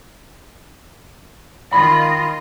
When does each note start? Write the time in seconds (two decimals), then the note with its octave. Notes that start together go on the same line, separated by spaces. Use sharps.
1.73 D#3 F4 D#5 B5